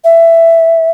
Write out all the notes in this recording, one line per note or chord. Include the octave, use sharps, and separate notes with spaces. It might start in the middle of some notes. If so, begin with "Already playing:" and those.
E5